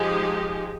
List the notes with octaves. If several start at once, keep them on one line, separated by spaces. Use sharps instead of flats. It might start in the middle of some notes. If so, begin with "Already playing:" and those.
Already playing: F3 G#3 D#4 G4 G#4